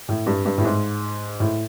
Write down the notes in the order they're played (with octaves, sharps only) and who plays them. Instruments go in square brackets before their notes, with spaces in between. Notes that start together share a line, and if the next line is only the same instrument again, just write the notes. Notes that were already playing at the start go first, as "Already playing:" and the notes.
[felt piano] A2
G2
G2
A2
G#2
A2